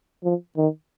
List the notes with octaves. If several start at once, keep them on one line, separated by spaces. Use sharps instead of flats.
F3
D#3